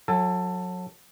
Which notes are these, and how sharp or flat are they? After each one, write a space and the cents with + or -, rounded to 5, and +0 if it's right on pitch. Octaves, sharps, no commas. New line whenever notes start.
F#3 -25 A4 +15 G#5 -15